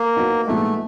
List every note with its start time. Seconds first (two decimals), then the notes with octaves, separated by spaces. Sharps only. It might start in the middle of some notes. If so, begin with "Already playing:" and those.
Already playing: A#3
0.16 F#3 B3 D#4
0.47 A#2 F3 G#3 A3 B3 D#4